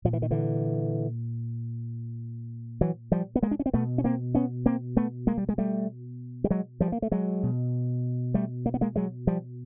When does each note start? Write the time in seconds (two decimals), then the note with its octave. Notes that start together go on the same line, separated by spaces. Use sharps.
0.05 A#2 F3
0.13 E3
0.22 D#3
0.31 D3 E3
2.81 E3 F#3
3.12 F3 G3
3.36 B3
3.43 G#3 A#3
3.51 D4
3.59 C#4
3.66 C4
3.74 B2 A3 B3
3.98 C#4
4.04 A#3 C4
4.35 B3 C#4
4.66 A#3 C4
4.97 A3 B3
5.27 G#3 A#3
5.38 G3
5.49 G#3
5.58 G3 A3
6.44 G3
6.50 F#3 G#3
6.80 F3 G3
6.92 A#3
7.02 A3
7.12 F#3 G#3
7.43 B2
8.34 G3 A3
8.66 A#3
8.74 B3
8.81 G#3 A#3
8.96 F#3 G#3
9.27 F3 G3